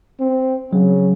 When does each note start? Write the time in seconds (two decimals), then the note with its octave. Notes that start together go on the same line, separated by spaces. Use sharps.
0.20 C4
0.73 C#3 F#3